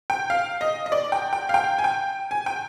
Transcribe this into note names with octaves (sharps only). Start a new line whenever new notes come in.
G5
F5
D#5
D#5
D5
G5
G5
F5
G5
G#5
G5
G#5
G5